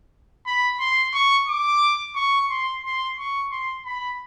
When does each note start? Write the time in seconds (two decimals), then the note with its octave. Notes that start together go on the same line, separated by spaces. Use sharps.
0.46 B5
0.80 C6
1.14 C#6
1.48 D6
2.16 C#6
2.50 C6
2.84 C6
3.18 C#6
3.52 C6
3.86 B5